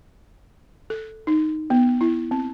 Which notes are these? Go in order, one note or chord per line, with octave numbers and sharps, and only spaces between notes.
A4
D#4
B3
E4
C4